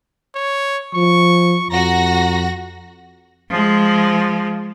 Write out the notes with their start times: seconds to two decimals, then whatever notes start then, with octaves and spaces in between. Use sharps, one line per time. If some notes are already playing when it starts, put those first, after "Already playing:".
0.35 C#5
0.95 F3 C#6
1.71 F2 F#4 A#5 A#6
3.49 F3 G#3